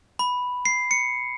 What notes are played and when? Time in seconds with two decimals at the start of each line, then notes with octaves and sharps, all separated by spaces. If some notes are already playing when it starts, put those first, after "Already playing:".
0.19 B5
0.65 C7
0.91 C#7